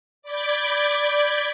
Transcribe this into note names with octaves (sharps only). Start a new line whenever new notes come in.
D5 B5 D6 G6 G#6